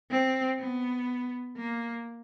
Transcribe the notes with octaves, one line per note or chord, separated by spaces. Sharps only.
C4
B3
A#3